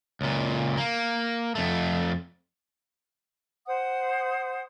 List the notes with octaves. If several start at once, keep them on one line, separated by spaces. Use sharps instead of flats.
C#2 A#2
A#3
F2 A3
C5 F#5 D#6